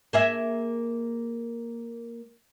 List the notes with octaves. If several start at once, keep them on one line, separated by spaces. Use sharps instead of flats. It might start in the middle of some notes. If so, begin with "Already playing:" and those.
A#3 G#4 E5